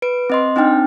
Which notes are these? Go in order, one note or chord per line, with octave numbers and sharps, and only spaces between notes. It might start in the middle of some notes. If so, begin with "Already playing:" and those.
B4 D7
C4 D#5 C6
C4 D4 D#4 G5 F6